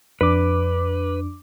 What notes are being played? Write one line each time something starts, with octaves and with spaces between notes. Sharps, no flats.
F2 D4 B4 D6